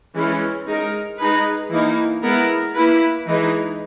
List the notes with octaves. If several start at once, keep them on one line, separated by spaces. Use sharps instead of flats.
E3 G#3 C#4 E4
G#3 D#4 A#4
G#3 D#4 G#4 B4
E3 A#3 D#4
G#3 B3 E4 A#4
A#3 E4 B4
E3 G#3 D#4 G#4